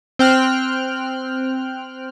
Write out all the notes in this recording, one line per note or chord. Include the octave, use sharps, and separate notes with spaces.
C4 G5 F6 F#6